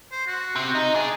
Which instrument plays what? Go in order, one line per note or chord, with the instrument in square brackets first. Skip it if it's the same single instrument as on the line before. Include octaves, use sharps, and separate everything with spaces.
[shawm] C5
F#4
[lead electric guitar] C3
D#4
[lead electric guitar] C2 G#4 [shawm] D4